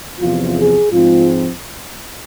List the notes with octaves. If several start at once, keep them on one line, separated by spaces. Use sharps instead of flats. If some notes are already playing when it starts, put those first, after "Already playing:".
E2 C3 F3 F4
G#4
G#2 F3 G#3 C4 F4